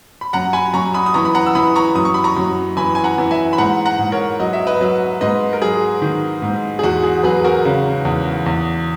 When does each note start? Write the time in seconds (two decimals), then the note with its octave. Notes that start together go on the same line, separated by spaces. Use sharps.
0.21 B5
0.33 F#2 F#5 A#5
0.53 G#5 B5
0.73 F#2 A#5 C#6
0.94 B5 D#6
1.06 D#6
1.14 E3 A#5 C#6
1.25 B5
1.35 F#5 A#5
1.46 E6
1.55 E3 B5 D#6
1.75 A#5 C#6
1.95 F#2 D#6
2.05 C#6
2.14 B5
2.24 A#5 C#6
2.37 F#2
2.77 E3 G#5 B5
2.95 G#5
3.04 F#5 A#5
3.18 E3
3.31 E5 G#5
3.53 B5
3.58 G#2 F#5 A#5
3.85 F#5 A#5
3.98 G#2
4.12 A#4 C#5
4.40 F#3 D#5
4.53 E5
4.67 B4 D#5
4.81 F#3
5.21 G#2 B4 D#5
5.53 A#4
5.62 F#3 G#4
6.02 D#3
6.42 G#2
6.79 G#4
6.83 E2 F#4
7.03 G#4
7.23 F#3 G#4 B4
7.44 F#4 A#4
7.65 C#3
8.05 E2
8.46 E2